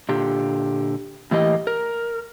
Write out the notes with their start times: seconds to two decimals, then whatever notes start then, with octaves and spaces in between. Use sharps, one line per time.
0.09 A#2 D3 G4
1.31 A2 E3 A#3 G4 D#5
1.67 A#4